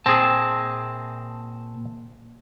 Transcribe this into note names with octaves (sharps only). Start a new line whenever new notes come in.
A#2 C4 G#4 A5